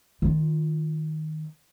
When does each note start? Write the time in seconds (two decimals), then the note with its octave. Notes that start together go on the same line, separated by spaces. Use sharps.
0.22 D#3 F4